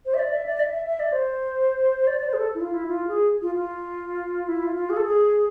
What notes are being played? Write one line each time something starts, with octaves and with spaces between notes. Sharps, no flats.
C5
E5
D5
E5
D5
E5
E5
E5
D5
C5
D5
D5
C5
G#4
A4
E4
F4
E4
F4
G#4
F4
F4
E4
F4
F4
G#4
A4
G#4